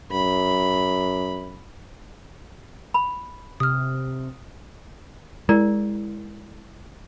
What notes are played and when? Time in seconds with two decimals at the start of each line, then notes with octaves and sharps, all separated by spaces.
0.12 F#2 B5
2.94 B5
3.60 C3 D#6 F6
5.49 G#3 E4 A#4 D5